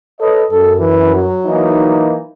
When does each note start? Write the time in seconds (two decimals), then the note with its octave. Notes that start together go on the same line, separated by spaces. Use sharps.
0.20 A4 B4 C#5 D#5
0.51 F#2 A4
0.80 E3
1.15 F#3
1.46 E3 A#3 D#4